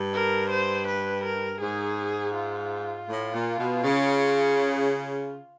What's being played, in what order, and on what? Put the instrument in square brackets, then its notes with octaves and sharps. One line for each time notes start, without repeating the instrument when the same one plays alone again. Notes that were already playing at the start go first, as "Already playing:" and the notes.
Already playing: [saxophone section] G2
[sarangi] A#4
C5
B4
A#4
[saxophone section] G#2 [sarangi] G#4
[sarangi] F4
[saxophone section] A2
A#2
B2
C#3